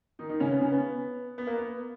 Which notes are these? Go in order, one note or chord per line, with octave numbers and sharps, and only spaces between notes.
D#3 D#4
D#3 D#4
C#3 C#4
B3
C#3 C#4
B3
B3
A#3
B3